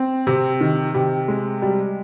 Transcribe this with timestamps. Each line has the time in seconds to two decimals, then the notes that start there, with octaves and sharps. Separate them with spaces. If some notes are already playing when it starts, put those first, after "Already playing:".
Already playing: C4
0.27 C3
0.61 D#3
0.94 C3
1.28 G#3
1.62 G3